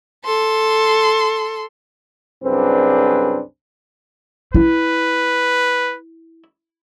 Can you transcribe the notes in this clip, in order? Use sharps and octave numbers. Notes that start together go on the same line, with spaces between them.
A4 C6
C2 F#2 C4 D4 G#4 B4
E4 B4